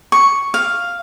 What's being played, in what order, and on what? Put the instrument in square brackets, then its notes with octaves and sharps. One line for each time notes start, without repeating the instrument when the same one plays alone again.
[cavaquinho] C#6
F5